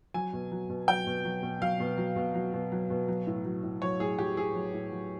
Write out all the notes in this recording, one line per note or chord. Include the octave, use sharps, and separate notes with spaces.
F#3 G#5
B2
F#3
B2
F#3 G5
B2
F#3
B2
F#3 F5
B2
F#3
B2
F#3
B2
F#3
B2
F#3
A2
F#3
A2
F#3 C#5
A2 G#4
F#3 G4
A2 G#4
F#3
A2
F#3